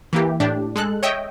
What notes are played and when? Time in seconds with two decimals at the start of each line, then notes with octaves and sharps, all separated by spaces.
0.13 E3 A#3 G4
0.40 A2 D4 G4
0.76 G#3 A4 F#6
1.03 C#5 D#5 E5 G5